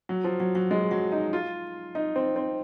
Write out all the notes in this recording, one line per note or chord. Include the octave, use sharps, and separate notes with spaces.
F#3
F3
F#3
F#3
G#3
F#3
D#4
F4
D#4
C4
C4